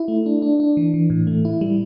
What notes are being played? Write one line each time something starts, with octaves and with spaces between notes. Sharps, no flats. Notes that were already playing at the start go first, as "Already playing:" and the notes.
Already playing: E4
A3
D4
D4
D4
E3
E3
A2
A3
E4
G3